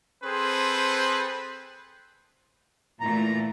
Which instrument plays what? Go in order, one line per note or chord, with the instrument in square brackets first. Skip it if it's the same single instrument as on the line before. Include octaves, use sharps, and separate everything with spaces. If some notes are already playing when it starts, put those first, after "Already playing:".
[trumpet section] C4 G#4 A4 B4 C5
[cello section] A#2 E3 A3 [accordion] A#5